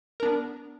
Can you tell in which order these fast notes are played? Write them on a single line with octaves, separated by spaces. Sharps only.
A#4 D4 B3